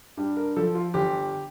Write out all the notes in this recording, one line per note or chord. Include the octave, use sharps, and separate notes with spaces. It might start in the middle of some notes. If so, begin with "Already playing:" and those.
G2 G4
A#4
F3 A4
F4
G1 G4